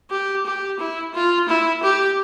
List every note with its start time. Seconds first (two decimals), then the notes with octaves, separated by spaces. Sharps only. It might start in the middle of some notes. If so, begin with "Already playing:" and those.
0.11 G4
0.46 G4
0.79 E4
1.14 F4
1.48 E4
1.83 G4